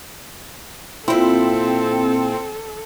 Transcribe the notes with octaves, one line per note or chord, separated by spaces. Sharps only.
A#2 C4 E4 A4